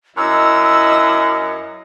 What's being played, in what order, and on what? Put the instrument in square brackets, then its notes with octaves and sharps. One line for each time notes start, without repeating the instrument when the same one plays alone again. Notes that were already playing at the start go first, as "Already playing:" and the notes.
[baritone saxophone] F#2 [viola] E4 D#5 [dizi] E6